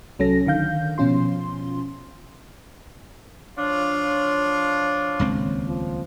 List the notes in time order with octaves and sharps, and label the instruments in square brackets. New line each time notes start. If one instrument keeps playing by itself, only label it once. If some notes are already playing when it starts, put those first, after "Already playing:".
[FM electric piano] C2 F#3 C#4 A4 A#6
D3 D#3 F5 G6
B2 F3 C#4 F4 C6
[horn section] F3 D4 F4 [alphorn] C#5
[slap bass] D#1 C#2 C4
[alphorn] F3